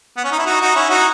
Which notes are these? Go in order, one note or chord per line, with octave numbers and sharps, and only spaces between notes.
B3
C#4
D#4
E4
D#4 F#4
D#4 F#4
C#4 E4
D#4 F#4